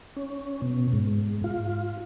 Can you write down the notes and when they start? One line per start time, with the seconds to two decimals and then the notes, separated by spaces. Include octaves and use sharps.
0.16 C#4
0.62 B2
0.93 G#2
1.44 F4